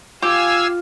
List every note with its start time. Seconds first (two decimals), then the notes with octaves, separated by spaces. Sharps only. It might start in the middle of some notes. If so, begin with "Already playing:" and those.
0.22 F4 G4 F5 G#5 E6